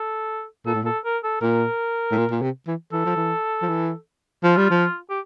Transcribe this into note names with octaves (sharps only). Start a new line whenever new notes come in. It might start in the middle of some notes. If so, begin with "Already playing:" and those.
Already playing: A4
A#2 A4
A2
A#2
A4
A#4
A4
A#2 A#4
A2
A#2
A#2
C3
E3
E3 A4
F3
E3
F3
E3
F3 F4
G3
F3
G4